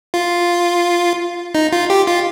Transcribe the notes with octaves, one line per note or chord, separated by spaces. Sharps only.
F4
D#4
F4
G4
F4